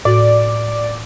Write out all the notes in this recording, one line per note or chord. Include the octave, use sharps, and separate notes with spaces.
A2 F#4 D5